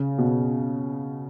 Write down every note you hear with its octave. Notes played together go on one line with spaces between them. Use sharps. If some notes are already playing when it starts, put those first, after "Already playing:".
Already playing: C#3
B2